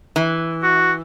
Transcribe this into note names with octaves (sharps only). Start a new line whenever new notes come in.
E3
F#4